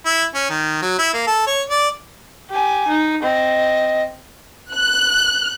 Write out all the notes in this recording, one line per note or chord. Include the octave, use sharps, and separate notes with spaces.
E4
C#4
D#3
F#3
E4
A#3
A4
C#5
D5
G4 G#5
D#4
C4 D#5
F#6